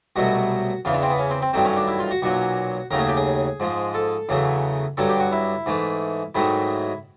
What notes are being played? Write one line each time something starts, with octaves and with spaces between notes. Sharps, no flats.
C2 B2 F#3 A3 F#4
E2 C#3 E3 F4
D4
C4
B3
C#4
C4
C4
G2 D#3 F#3 A3 C4
C#4
D4
E4
F4
F#4
B1 A#2 F#3 F#4
D#2 C#3 F#3 A3 A#4
G#4
G4
G#4
G#2 F3 G#3
A4
E2 C#3 F#3 A3
G2 D3 F#3 A4
G4
F#4
E4
G#2 E3 A3
G#2 D#3 F#3 A3 E4